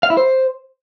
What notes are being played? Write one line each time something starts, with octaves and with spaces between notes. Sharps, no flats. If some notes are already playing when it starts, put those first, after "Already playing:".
F5
E4
C5